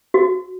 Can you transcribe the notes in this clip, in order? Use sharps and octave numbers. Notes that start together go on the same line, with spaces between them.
F#4